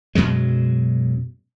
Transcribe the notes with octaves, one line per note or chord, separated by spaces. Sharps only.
F#2 B2 F#3 G#3